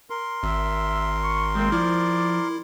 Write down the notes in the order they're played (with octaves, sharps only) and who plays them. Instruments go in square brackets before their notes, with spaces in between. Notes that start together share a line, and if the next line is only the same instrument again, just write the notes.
[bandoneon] A#4 C6
[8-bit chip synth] G#1 [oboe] E5
[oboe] C#6
[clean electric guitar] G#3 A#3 [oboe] C4
[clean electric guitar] F3 [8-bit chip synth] E4 [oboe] D5